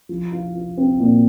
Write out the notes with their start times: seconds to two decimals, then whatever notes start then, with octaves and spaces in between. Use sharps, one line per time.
0.09 F3
0.32 F4
0.55 F4
0.77 C4
1.00 A#2